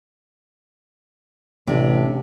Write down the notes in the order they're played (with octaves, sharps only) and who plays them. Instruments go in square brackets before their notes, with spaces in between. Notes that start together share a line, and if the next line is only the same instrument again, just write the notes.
[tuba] A1 [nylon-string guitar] C3 D4